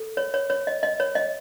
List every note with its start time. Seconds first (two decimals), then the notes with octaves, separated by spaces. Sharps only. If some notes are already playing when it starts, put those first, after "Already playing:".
Already playing: A4
0.17 C#5
0.34 C#5
0.50 C#5
0.67 D#5
0.83 D#5
1.00 C#5
1.15 D#5